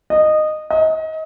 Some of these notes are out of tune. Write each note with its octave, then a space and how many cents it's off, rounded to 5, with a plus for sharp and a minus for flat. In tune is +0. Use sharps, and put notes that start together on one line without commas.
D#5 -15
D#5 +30